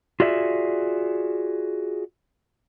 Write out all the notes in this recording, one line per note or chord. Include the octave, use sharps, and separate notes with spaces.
F4 F#4 G#4 D5 E5